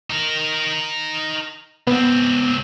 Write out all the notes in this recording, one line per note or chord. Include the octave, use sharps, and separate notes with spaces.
D#4 A#4
C#2 B3 C4